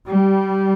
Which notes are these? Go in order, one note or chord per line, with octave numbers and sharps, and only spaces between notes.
G3